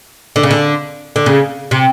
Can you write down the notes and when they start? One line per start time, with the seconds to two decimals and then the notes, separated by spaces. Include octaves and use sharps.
0.36 D3
0.43 C#3
0.51 D3
1.16 D3
1.26 C#3
1.71 C3